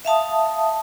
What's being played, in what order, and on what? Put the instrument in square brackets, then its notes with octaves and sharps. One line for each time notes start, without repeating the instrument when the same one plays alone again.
[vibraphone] E5 F5 A5 D#6